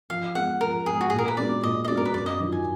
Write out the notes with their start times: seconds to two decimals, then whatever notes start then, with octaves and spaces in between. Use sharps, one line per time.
0.10 F3 F5
0.35 G#3 B3 F#5
0.61 F3 A#4
0.86 G#3 B3 G#4
1.01 F#4
1.10 A#2 G#4
1.19 A#4
1.28 B4
1.37 G#3 B3 D4 F#4 D5
1.63 A#2 D#5
1.84 D#5
1.88 G#3 B3 D4 F#4 D5
1.97 A#4
2.05 B4
2.14 F#2 D5
2.26 D#5
2.39 D#3 F#3 D4 F4
2.52 G#5